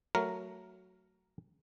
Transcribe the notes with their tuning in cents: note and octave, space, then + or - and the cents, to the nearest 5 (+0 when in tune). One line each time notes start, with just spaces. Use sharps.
F#3 +0 A3 +15 A#4 +0